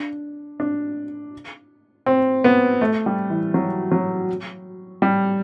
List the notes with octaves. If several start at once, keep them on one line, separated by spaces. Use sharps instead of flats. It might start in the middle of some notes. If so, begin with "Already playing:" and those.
Already playing: D4
D4
C4
B3
A3
G3
E3
F#3
F#3
G3